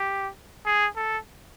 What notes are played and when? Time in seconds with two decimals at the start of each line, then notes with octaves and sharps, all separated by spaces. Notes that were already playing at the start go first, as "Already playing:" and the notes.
Already playing: G4
0.66 G#4
0.96 A4